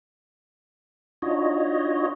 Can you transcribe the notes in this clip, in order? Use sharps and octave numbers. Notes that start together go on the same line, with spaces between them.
D4 D#4 F4 F#4 C#5 D#5